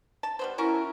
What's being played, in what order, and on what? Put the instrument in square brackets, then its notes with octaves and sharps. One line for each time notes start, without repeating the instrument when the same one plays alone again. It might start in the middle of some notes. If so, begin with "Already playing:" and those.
[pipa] A5
G3 B3 C5
[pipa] C#4 F#4 A#4 [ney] E4